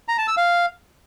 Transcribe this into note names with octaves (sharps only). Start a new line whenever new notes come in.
A#5
A5
E6
F5